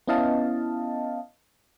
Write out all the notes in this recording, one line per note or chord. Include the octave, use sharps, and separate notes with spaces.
B3 C#4 E4 D#5 F5 A5